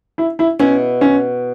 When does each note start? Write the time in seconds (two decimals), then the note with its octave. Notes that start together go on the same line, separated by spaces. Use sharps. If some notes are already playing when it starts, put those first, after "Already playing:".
0.18 E4
0.39 E4
0.59 B2 B3 C#4 E4
1.01 C#4